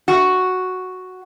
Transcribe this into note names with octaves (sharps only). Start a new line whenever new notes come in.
F#4